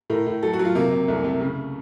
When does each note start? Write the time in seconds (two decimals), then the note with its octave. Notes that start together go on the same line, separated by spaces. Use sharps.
0.10 A2 A#4
0.26 A2
0.43 F#3 A4
0.53 F#4
0.59 F#3
0.65 F4
0.75 C3 A#3
0.92 C3
1.08 C2 A3
1.24 C3
1.41 C#3